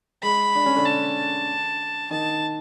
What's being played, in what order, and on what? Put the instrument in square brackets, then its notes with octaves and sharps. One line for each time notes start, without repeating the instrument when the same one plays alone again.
[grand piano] G#3 [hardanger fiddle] B5
[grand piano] D4
C#4
D3 D4
[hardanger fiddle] A5
[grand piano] D#3 D#4 [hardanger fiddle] A5